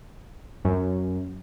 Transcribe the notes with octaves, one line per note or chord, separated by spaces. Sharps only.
F#2